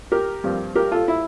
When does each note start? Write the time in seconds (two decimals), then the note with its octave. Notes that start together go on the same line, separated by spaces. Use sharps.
0.12 G4 A#4
0.44 G2 F3 C4
0.75 G4 A#4
0.91 F4 A4
1.08 E4